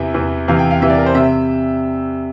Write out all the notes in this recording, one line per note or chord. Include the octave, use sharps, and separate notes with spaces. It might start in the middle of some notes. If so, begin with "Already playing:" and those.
Already playing: E2 C3 E3 E5
E2 C3 E3
E2 C3 E3 F5
G5
F5
E2 C3 E3 E5
D5
A#4
C5
C3 E5